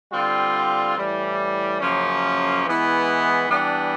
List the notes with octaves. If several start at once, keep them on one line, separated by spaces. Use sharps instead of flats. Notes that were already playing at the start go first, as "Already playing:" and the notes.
D3 G3 C4 F4
A2 E3 G3
F#2 C#3 F3 A#3 C#4
E3 G#3 B3 E4
E3 G3 B3 D4